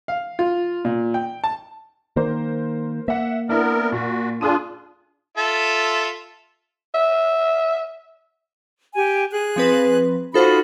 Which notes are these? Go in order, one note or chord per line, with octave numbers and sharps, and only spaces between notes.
F5
F4
A#2
G5
A5
D#3 A#3 A#4 C5
A#3 E5 F#5
B3 D4 E4 A#4
A#2 F#4
D4 F4 G#4 D#6 D#7
F4 A4 E5
E5
G4 G#5
G#4 F#6
F3 C4 B4
D#4 F4 F#4 A4 C5 B5